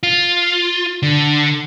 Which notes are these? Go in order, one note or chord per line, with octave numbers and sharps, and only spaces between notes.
F4
D3